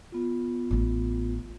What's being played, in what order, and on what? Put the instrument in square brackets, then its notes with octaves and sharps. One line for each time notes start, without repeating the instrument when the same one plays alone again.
[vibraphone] B3 F4
[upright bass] A1 A3